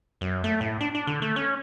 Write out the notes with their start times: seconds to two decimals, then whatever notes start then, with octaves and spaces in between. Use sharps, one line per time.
0.21 F#2
0.44 A3
0.61 A2
0.81 D4
0.95 D4
1.07 D3
1.22 A3
1.36 C#4